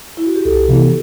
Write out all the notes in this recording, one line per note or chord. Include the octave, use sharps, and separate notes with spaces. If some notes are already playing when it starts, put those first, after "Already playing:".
E4
F#4
G4
C2 A4
C3 E3 B3 E4 A4